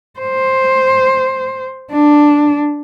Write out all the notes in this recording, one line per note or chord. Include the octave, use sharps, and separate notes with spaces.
C5
D4